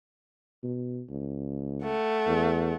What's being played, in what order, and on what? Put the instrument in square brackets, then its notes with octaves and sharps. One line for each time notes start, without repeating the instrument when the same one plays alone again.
[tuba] B2
C#2
[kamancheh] A3 F#5
[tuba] E2